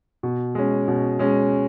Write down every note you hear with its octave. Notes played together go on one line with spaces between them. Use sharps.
B2
G#3 C#4
B2
G#3 C#4